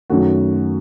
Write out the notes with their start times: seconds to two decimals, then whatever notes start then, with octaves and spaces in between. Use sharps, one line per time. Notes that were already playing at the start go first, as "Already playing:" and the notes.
0.10 F#2 D#3 F#3 A3 F#4